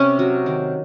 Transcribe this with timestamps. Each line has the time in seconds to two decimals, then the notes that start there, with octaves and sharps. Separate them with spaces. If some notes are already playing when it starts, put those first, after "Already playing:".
Already playing: C3 C#4
0.19 F#3
0.46 D#3